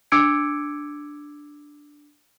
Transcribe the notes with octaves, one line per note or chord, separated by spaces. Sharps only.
D4 D6 E6 G#6 C#7 D7